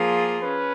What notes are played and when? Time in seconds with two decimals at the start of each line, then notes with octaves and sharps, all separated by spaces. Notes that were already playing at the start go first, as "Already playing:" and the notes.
Already playing: F3 A#3 F4 G#4
0.43 C#4 B4